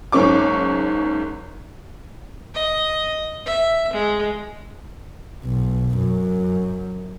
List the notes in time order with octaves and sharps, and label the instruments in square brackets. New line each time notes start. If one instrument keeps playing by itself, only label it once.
[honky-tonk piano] F#1 G#2 C#4 C#6 D6
[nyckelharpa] D#5
E5
G#3
[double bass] B1
F#2